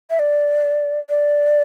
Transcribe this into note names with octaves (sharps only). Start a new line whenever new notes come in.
E5
D5
D5